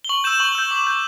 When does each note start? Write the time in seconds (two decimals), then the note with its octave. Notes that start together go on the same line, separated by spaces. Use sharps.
0.04 G7
0.09 C#6 F#7
0.24 E6 G6 E7
0.40 C#6 F#7
0.55 E6 G6
0.71 D6
0.87 G6